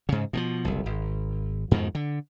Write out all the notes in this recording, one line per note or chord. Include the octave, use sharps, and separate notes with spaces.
G#2 C#3
B2 E3 F3
F#1 C2
G#1
F2 G#2 B2 D#3
D3